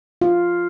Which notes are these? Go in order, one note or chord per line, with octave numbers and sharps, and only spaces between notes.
F4